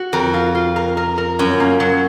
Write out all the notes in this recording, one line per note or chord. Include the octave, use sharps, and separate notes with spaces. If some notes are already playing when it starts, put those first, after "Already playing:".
Already playing: F#4
F2 A#4
F4
F4
A#4
A#4
A#4
F#2 C#4
A#3
F#3